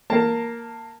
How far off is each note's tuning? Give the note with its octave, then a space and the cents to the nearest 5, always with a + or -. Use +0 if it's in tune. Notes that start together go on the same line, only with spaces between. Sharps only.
A#3 +0 A#4 +0 A5 +20